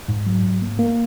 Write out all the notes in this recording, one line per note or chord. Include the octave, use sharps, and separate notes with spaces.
G#2
F#3
G#2
A#3
A#3